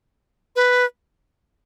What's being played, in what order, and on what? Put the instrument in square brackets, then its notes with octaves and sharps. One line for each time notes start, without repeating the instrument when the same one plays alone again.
[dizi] B4